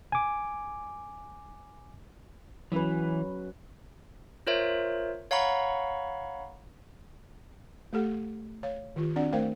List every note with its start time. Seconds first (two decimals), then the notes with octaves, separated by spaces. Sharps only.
0.12 G#5 D6
2.72 E3 F#3 C#4 B4
4.47 F4 A#4 C5 C#5 E5
5.31 C#5 F5 F#5 A#5 B5 C#6
7.93 A3 G4 A4 F#5
8.63 C#5 F5
8.96 D#3 F4 G4
9.16 C4 D4 F#4 D5 F#5
9.32 A3 A#4 C5 F5 G5